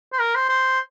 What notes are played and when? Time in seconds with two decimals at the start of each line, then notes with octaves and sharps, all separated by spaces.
0.13 C5
0.20 A#4
0.35 C5
0.49 C5